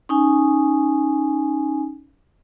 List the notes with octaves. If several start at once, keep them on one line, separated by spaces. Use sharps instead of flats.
C#4 D#4 G#5